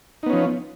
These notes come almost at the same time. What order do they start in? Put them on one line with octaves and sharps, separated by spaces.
D#4 B3 C#4 F3